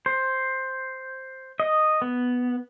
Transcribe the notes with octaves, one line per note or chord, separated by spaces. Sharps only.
C5
D#5
B3